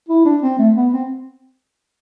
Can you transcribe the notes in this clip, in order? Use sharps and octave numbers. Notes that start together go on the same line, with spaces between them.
E4
D4
C4
A3
B3
C4